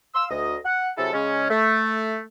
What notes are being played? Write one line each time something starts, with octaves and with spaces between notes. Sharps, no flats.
F5 C6 E6
D2 D#5
F#5
C3 F#3 E4 G#4 A4
C#3 G#3 C#4
A3